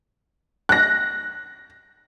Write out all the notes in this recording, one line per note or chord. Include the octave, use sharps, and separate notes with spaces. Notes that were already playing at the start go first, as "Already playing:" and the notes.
F#6 A#6